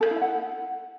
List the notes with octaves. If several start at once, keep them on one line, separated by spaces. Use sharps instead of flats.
A4
F5
E4
E5
F#5